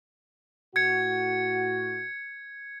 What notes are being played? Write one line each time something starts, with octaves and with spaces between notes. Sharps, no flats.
A2 F#4 G#6 C#7